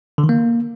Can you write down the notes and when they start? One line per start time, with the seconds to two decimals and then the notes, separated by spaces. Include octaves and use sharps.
0.18 D3
0.24 D#3
0.29 A#3